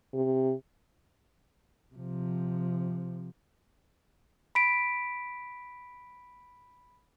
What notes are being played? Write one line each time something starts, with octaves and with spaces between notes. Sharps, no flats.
C3
C3 F3
B5 B6 D7